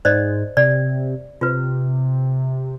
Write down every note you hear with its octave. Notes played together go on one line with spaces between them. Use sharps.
G#2 C5 D5 D#5
C3 D5
C3 F4 B4